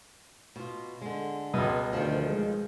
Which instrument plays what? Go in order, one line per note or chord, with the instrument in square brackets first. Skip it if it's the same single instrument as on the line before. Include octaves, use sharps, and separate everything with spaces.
[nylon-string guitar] B2 F4
D3 G#3
[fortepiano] C#2 B2
[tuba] D2 [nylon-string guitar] D#3 F3
[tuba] G#3